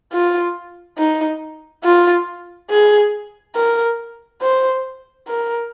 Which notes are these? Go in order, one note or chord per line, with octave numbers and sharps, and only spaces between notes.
F4
D#4
F4
G#4
A#4
C5
A#4